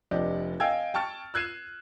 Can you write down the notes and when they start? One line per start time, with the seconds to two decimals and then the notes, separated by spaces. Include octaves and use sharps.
0.11 F1 D4 G4 D5 D#5
0.60 D#5 F5 G5 G#5 E6 G#6
0.94 G5 A5 C#6 F6 A6
1.34 E6 F#6 G#6 C7 D#7 E7